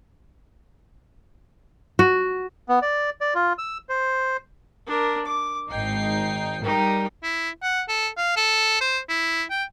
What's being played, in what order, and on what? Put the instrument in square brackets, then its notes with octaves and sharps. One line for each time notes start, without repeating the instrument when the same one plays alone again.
[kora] F#4
[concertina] B3
D5
D5
F4
E6
C5
[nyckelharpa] D4 A#4
D6
[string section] G#1 D#4 C7 [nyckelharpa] G5
[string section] G3 G4 [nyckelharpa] D#4 A#4
[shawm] E4
F#5
A4
F5
A4
C5
E4
G5